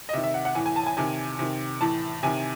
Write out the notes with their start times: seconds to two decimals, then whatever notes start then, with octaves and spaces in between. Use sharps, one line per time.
0.09 D#5
0.13 C3 D#3 E5
0.24 E5
0.34 F#5
0.45 F#5
0.55 A2 E3 G#5
0.66 G#5
0.76 A5
0.87 G#5
0.97 C3 D#3 G#5
1.39 C3 D#3
1.81 A2 E3 A5
2.23 C3 D#3 G#5